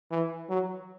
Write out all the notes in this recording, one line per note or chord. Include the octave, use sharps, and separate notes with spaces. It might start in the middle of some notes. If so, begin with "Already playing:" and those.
E3
F#3